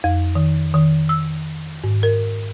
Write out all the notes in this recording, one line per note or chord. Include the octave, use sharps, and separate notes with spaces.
F2
D#3
D#3
E6
G#2
A#4